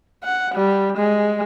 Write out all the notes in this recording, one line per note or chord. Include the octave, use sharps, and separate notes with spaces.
F#5
G3
G#3